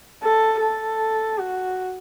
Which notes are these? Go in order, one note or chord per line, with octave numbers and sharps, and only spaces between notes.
A4
A4
F#4